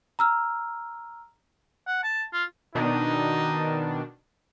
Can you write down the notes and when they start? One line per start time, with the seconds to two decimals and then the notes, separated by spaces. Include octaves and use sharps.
0.19 A#5 E6 F6
1.87 F#5
2.03 A5
2.32 F4
2.75 B2 D#3 D4 D#4